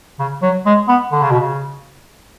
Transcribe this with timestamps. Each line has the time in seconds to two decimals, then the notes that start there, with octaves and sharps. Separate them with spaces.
0.19 C#3
0.42 F#3
0.66 G#3
0.88 B3
1.12 D3
1.22 C#3
1.31 B2
1.40 C#3